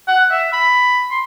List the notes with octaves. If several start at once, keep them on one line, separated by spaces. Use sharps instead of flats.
F#5
E5
B5
C6